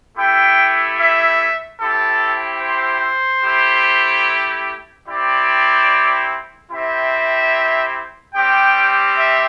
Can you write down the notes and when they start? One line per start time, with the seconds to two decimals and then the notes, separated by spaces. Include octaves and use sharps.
0.15 A3 E4 G4 G5
0.97 E5
1.80 C4 E4 G4 A4
2.61 C5
3.43 A3 E4 G4
5.06 C4 E4 G4 D5
6.70 C4 E4 G4 E5
8.34 G3 C4 G4 G5
9.16 E5